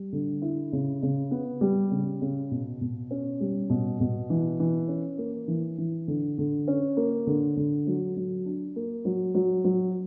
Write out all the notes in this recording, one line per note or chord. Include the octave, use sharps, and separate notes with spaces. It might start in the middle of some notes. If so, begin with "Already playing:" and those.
Already playing: G3
D3
E4
C#3
C#3
B3
G3
C#3
C#3
B2
B2
C#4
G3
B2
B2
E3
E3
C#4
A#3
E3
E3
D3
D3
C#4
A#3
D3
D3
F#3
F#3
D4
A#3
F#3
F#3
F#3